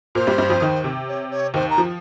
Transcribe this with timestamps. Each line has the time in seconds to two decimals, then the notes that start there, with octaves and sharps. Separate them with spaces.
0.15 A#2 A#3 C5
0.27 G2 G3
0.38 G2 G3
0.49 F2 F3
0.61 D#2 D#3
0.84 C3
1.08 C#5
1.31 C#5
1.54 D#2 D#3 C5
1.70 A#5
1.78 F3